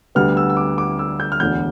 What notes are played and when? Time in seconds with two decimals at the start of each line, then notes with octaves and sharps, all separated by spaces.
0.15 D2 D3 G3 B3 F6
0.37 E6
0.50 E6
0.57 D6
0.78 D6
0.99 E6
1.20 G6
1.32 F6
1.40 E1 D2 D3 G6